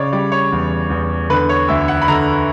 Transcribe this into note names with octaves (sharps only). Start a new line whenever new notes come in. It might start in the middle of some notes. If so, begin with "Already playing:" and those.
Already playing: C#3 C#5 D5
G3 D5
C#5
E2
E2
D3 B4
C#5
D2 E5
F#5
B5
D3 A#5